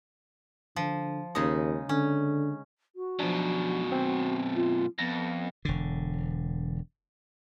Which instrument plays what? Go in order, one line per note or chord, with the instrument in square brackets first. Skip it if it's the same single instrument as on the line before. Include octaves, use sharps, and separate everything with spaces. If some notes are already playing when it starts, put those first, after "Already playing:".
[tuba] D3 [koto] F3
[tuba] D#2 [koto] C#3 G#3 D#4
[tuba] D3 [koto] C#4
[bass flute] F#4
[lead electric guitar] F#2 B2 [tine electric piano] F3 D4
[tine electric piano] C4
[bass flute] F4
[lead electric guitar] F2 [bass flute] B3 [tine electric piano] A#6
[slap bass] E1 D3